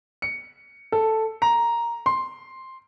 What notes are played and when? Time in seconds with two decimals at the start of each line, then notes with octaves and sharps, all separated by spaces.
0.22 C#7
0.92 A4
1.42 A#5
2.06 C6